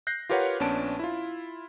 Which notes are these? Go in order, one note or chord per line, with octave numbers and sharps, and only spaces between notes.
F#6 G6 A#6 C7
F4 G4 A#4 B4 C#5 F#5
A#1 B3 C#4 D4 A5 D7
E4 F4